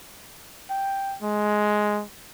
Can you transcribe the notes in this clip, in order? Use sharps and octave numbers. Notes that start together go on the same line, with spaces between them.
G5
G#3